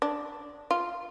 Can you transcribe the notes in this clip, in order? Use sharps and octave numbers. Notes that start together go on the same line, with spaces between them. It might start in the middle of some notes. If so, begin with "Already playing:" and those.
D4
F4